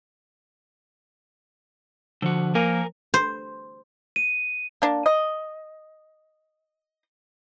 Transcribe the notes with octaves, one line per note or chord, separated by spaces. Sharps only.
D3 F3 F#4
A#3 A#4 G#5
C5
D#7
A#3 D4
D#5